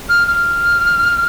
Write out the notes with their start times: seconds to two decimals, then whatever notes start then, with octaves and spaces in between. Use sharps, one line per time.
0.09 F6
0.27 F6